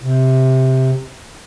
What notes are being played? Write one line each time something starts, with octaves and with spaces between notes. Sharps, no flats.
C3